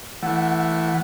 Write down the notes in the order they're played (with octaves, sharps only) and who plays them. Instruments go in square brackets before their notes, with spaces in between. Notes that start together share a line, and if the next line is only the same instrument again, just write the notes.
[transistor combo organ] E3 A3 [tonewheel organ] F#5